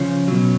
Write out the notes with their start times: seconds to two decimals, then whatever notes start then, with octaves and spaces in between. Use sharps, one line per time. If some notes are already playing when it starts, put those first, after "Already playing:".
Already playing: C#3 F3 C#4
0.28 B2 F#3